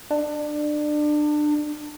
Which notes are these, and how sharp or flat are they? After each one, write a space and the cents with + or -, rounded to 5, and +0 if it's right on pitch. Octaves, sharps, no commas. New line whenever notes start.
D4 +25